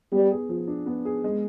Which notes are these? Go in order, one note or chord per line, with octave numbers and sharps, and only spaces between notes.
G3 B3
G#4
F3
D4
B3
G#4
G#3